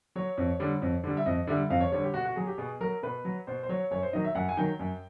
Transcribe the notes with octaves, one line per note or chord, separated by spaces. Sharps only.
F#3 C#5
F2
D3 G3
F2
D3 G3
E5
F2 D#5
D3 G3 E5
F2 F5
C#5
D3 G3 C#5
G4
B2 F#4
F#4
F#3 G#4
G4
B2 G#4
F#3 A#4
B2 B4
F#3
B2 C5
C5
F#3 C#5
F#2 C#5
C5
D#3 F#3 D#5
E5
F#2 F#5
G#5
D#3 F#3 G5
F#2